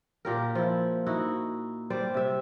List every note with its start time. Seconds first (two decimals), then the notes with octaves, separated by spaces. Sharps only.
0.25 A#2 G4 A#4
0.55 F3 E4
1.06 D#4 E4 F#4
1.90 G3 C5 D5
2.14 C3 E5